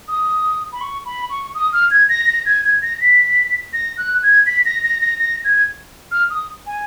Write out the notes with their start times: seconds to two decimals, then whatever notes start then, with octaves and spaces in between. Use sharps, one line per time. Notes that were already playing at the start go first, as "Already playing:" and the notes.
0.08 D#6
0.73 B5
0.81 C#6
1.05 B5
1.30 C#6
1.55 D#6
1.73 F6
1.91 G#6
2.09 A#6
2.27 A#6
2.46 G#6
2.64 G#6
2.82 A#6
3.01 B6
3.73 A#6
3.98 F#6
4.23 G#6
4.46 B6
4.65 A#6
4.84 A#6
5.01 A#6
5.19 A#6
5.45 G#6
6.11 F6
6.30 D#6
6.66 G#5